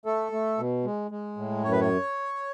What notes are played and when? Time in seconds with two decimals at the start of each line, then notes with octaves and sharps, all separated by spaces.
0.06 A3 A4
0.32 A3
0.58 B2
0.85 G#3
1.11 G#3
1.37 A2
1.64 F#2 C#5
1.72 B4
1.81 C#5